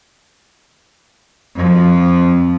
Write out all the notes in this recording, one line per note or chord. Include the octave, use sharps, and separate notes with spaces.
F2 F3